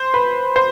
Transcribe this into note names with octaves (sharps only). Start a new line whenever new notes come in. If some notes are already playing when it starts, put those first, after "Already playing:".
Already playing: C5
B4
C5